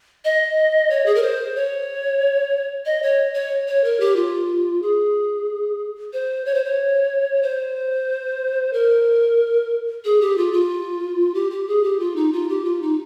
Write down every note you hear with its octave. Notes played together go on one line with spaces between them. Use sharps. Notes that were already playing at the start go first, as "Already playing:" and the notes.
D#5
C#5
G#4
A#4
C5
C#5
D#5
C#5
C#5
C#5
A#4
G4
F4
G#4
C5
C#5
C5
C#5
C5
A#4
G#4
G4
F4
F4
G4
G4
G#4
G4
F4
D#4
F4
G4
F4
D#4